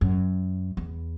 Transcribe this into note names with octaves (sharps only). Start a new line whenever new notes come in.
F#2
E2